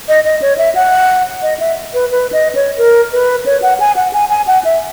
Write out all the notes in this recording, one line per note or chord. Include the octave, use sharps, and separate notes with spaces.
D#5
D#5
C#5
E5
F#5
D#5
E5
B4
B4
D#5
C#5
A#4
B4
C#5
F#5
G#5
F#5
G#5
G#5
F#5
E5